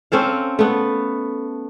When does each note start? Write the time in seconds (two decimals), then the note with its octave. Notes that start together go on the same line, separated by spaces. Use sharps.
0.12 C4 C#4 A4 F5
0.59 A3 B3